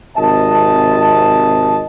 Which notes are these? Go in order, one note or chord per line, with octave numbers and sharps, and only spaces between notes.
G#1 C3 D#5 A5